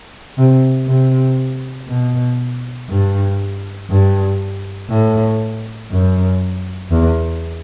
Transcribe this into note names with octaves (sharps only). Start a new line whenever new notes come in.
C3
C3
B2
G2
G2
A2
F#2
E2